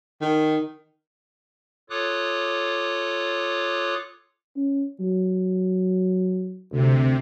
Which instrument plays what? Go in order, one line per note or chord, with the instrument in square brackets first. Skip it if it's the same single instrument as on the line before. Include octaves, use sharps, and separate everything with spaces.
[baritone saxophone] D#3
[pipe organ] F4 A4 C#5 D6 D#6 F#6
[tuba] C#4
F#3
[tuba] D2 [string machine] C3